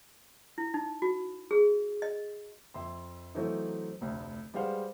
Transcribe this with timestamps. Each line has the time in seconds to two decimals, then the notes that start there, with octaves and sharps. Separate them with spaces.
0.58 E4
0.74 D#4
1.02 F#4
1.51 G#4
2.02 D#5
2.74 F2 E5 C6
3.35 E3 F#3 A3 C4 D#4
4.01 F1 D2
4.54 G3 G#3 B4 C5 F5 F#5